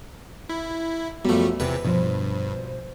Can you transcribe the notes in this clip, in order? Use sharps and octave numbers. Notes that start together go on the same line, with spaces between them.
E4
F#2 F3 G3 A3 B3
E2 C3 B4
G2 B2 F3 C5